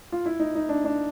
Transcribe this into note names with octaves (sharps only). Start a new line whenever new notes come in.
F4
E4
D#4
D#4
D4
D4